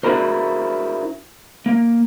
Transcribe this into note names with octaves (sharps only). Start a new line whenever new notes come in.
D4 E4 F#4 G#4 A#4 C5
A#3